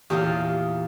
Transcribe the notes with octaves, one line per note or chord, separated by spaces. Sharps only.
E2 A#2 F4 G4 D#6